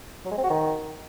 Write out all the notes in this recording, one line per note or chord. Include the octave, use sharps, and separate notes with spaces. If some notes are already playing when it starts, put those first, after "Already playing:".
F#3
G#3
C4
F#4
D#3